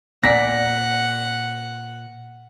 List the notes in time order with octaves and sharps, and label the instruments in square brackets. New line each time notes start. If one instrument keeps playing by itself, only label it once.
[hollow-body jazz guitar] A#2 D5 [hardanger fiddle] F#5 [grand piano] A#6 B6